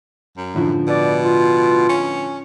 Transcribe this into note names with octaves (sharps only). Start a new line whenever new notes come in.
F#2
A2 D3 F3
B2 D5
F4
C#4